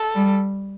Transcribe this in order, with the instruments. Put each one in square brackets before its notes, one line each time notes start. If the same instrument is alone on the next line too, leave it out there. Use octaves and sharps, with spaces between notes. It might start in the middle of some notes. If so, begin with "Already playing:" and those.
Already playing: [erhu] A4
[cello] G3